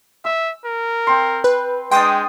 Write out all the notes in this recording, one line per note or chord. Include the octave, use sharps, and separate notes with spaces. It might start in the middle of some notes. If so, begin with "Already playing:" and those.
E5 E6
A#4
C4 C6
B4
G#3 D4 G5 C6 D#6